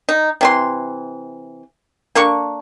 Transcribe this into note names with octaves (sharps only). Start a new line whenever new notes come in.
D#4
C3 E3 C6
A#3 D4 A4 C#6